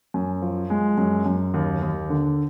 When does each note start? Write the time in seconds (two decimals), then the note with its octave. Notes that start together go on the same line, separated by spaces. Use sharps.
0.14 F#2
0.42 F3
0.70 G#3
0.98 F#2
1.26 F#2
1.54 D#2
1.82 D#2
2.10 D3